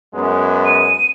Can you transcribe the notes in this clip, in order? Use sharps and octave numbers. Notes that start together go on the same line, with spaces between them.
F#2 G#3 B3
D#7